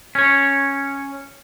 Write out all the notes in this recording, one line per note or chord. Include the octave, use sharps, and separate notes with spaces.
C#4 C#5